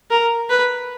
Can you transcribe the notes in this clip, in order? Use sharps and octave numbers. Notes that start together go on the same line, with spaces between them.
A#4
B4